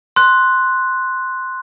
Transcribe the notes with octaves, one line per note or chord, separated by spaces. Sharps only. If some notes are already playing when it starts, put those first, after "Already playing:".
C6 F#6